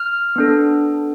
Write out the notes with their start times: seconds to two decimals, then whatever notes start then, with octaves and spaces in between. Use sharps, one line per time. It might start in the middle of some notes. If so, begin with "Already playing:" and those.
Already playing: F6
0.36 B3 D4 A4